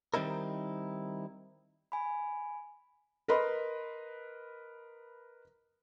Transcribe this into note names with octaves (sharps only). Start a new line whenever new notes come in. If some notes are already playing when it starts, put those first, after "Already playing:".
D#3 G3 C4 D#4 E4 A#4
G#5 B5
A#4 B4 D#5 B5 C6